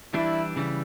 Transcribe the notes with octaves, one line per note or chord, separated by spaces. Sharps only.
E3 G3 D4 E4
C#3 E3 G3